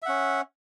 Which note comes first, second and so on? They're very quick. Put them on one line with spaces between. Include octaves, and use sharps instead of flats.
E5 F#5 C#4